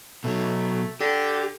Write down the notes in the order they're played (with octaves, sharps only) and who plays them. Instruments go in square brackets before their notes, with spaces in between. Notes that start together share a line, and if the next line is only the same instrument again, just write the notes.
[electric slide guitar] B2 F#3 [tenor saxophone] A3
[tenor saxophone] D3 [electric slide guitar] G4